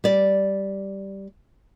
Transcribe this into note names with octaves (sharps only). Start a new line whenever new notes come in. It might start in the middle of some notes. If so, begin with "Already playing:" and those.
G3 D5